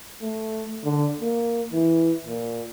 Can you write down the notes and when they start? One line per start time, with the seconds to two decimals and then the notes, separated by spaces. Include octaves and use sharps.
0.22 A3
0.84 D3
1.21 A#3
1.73 E3
2.25 A#2